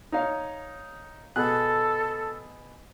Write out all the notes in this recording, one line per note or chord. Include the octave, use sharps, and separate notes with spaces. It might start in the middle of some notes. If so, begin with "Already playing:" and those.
D#4 C#5 F5
B2 G#4 A4 F#6